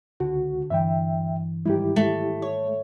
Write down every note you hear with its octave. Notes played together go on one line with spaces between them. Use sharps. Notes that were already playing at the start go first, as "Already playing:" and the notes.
C#2 D3 F#4
G2 E3 E5 G5
G#2 D#3 G3 E4 G4
A3
C#5